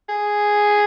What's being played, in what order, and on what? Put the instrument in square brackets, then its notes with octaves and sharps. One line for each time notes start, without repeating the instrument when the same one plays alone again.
[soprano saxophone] G#4